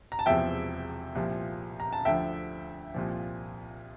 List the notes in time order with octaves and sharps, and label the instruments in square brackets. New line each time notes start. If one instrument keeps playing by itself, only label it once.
[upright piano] A#5
A5
E1 E2 C3 F3 E5 G5
C2 A#2 F3
A#5
A5
D2 D3 F3 E5 G5
C2 A#2 F3